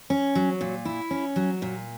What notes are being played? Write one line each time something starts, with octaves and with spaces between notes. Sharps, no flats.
C#4
F#3
A#2
E4
C#4
F#3
A#2